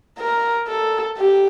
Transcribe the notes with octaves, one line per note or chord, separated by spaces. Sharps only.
A#4
A4
G4